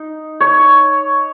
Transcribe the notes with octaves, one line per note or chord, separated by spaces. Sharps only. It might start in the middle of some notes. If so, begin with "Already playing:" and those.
Already playing: D#4
C#5